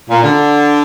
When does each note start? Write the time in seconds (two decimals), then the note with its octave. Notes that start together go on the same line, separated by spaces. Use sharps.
0.09 A#2
0.24 D3